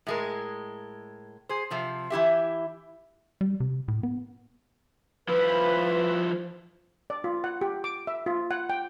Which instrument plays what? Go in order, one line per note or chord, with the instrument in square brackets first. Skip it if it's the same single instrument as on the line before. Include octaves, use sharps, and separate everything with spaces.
[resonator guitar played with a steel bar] A2 G#3 A#4
G#4 C5
C3 F3 C4
E3 E4 G4 E5
[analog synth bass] G3
C3
A2
B3
[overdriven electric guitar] F3 E4 [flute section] B4
[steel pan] D5
F4
F#5
G4
D6
E5
F4
F#5
G5